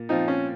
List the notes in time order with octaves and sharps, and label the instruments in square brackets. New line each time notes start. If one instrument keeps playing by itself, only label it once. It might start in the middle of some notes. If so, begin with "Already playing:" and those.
Already playing: [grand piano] A#2
[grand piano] F3 C4 F4 [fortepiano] D#4
[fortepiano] C#4